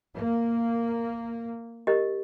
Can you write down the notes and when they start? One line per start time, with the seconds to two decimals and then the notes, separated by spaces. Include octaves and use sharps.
0.15 A#3
1.87 G4 A#4 D#5